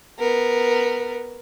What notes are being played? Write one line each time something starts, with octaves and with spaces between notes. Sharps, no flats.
B3 A#4